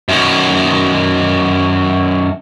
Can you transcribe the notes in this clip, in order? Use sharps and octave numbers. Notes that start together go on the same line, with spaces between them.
F#2 D#3